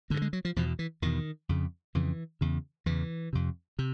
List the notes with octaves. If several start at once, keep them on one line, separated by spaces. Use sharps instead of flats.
G2 D3 A#3
G#3
F#3
F3
E2 B2 F3
E3
E2 B2 D#3
F2 C#3
F2 C#3 E3
E2 C#3
E2 C#3 E3
F2 C3
C3